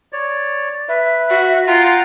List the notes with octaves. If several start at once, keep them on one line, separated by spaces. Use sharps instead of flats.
C#5 D5
B4 E5
F#4
F4 F#5 G5 A#5